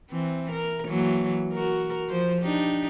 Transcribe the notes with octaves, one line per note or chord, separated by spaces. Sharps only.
E3 C4
A#4
E3 F#3 A#3
F#4 A#4
F3 C5
D4 D#4 G4